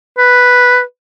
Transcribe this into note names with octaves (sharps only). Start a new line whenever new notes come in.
B4